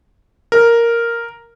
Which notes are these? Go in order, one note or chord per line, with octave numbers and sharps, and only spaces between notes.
A#4